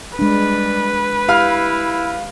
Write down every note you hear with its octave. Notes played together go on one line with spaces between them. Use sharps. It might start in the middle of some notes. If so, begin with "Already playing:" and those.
G3 G#3 D4 B4
E4 G4 F5 F6